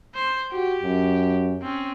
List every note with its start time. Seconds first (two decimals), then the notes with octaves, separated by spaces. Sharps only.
0.15 C5
0.52 F#4 G4
0.83 F#2
1.62 C4 C#4